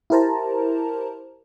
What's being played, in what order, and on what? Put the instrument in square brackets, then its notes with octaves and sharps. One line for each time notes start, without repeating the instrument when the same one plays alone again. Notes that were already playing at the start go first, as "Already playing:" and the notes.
[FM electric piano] E4 G4 A#4 C5 A5 A#5